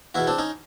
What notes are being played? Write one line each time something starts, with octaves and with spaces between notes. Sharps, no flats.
E2 B2 E4 F#4
C4 D4
C#4 D#4